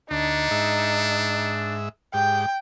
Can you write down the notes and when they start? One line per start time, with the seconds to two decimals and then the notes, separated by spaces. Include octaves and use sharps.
0.11 D2 D4 D#4
0.51 G#2 E5
2.14 G#2 G4 G5